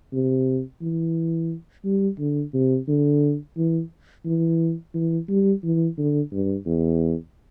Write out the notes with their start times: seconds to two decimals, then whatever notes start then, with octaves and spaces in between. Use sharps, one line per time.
0.12 C3
0.81 E3
1.84 G3
2.19 D3
2.53 C3
2.88 D3
3.57 E3
4.25 E3
4.94 E3
5.28 G3
5.64 E3
5.97 D3
6.32 G2
6.66 E2